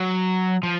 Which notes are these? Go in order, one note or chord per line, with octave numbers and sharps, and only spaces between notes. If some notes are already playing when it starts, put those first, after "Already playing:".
Already playing: F#3
F3